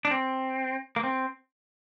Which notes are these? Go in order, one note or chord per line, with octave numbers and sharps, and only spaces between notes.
D4
C4
A#3
C4